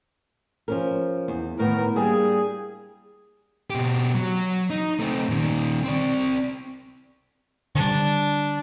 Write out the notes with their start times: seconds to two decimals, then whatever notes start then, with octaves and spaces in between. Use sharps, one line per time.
0.68 F3 C#4 A#4
1.28 E2
1.59 A2 D#3 B3 A#4
1.96 G3 A#3 D4 G#4
3.70 B2 G4
4.15 F#3
4.70 D#4
5.00 A3 C4
5.29 A#2 D#3
5.84 C4 D5
7.75 D3 G3 D4